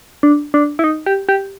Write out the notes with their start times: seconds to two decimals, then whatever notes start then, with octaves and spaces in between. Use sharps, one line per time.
0.23 D4
0.54 D4
0.79 E4
0.84 D#4
1.06 G4
1.29 G4